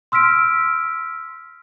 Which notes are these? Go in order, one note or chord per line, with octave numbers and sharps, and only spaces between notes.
C6 E6 F6 B6 D7